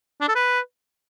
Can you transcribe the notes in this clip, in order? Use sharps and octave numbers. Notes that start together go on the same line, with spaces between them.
D4
A4
B4